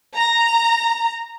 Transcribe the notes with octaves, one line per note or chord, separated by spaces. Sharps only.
A#5